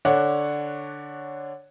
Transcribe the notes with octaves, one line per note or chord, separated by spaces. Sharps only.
D3 D4 C#5 F#5